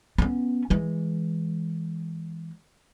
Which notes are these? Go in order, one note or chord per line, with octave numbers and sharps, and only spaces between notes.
B3 C#4
E3 G#3